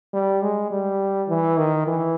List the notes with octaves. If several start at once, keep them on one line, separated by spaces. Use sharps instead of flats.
G3
G#3
G3
E3
D#3
E3